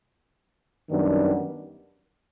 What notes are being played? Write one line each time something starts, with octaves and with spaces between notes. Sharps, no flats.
F#2 D#3 G3 B3 D4